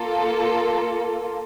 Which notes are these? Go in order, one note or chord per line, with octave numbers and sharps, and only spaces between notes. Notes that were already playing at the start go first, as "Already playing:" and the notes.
Already playing: A#3 F4 A4